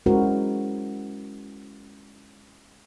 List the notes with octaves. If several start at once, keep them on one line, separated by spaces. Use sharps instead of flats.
G#3 C#4 E4 F#4 A#4 C5